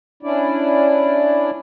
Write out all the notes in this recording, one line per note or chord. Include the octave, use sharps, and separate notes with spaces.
C#4 D4 E4 D5